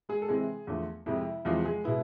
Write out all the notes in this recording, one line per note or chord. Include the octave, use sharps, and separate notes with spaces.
G#3 G#4
A4
C3 E3 G#3 C4 G#4
E2 D3 F3 A3
F2 C3 G#3 E4
E2 C3 E3 F3 G#3 F4
G#3 G#4
B2 G#3 B3 E4